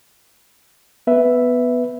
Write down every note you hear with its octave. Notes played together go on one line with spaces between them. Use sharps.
B3 B4 E5